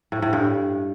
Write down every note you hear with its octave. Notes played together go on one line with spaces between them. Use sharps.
A2
A2
G2